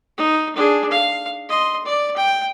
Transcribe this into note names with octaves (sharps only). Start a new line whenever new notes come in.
D#4
D4 G#4
F5
D#5 C6
D5
G5